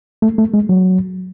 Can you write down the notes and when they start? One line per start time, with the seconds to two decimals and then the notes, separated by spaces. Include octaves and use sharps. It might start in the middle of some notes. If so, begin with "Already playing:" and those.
0.22 A3
0.38 A3
0.54 G#3
0.69 F#3